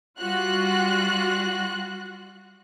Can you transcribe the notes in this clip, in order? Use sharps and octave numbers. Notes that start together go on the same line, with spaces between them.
G3 F4 F#4 F#6